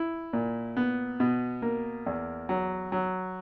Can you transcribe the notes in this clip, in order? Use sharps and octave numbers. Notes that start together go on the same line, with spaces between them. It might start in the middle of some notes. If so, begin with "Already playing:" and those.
Already playing: E4
A#2
B3
B2
A#3
E2
F#3
F#3